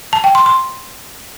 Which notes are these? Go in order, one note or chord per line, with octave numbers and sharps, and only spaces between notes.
A5
G5
C6
C6